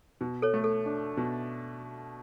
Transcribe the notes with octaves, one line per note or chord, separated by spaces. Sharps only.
B2
A4 C#5
A3
A4
D4
B2